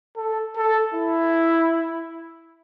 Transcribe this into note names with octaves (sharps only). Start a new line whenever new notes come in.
A4
A4
E4